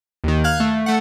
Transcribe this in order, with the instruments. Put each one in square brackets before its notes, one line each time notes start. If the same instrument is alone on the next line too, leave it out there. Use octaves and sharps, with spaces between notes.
[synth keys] D#2 D#3
F5 F#6 G#6
A3
A3 F#5